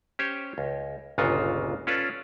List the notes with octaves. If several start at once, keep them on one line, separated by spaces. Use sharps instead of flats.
C#4 G4 C5 C#5
C#2
G1 C#2 A#2 C#3 F4 F#4
C#4 F4 A4 B4 D5